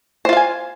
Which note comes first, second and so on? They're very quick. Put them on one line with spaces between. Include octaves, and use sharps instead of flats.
C5 F4 F5 G#5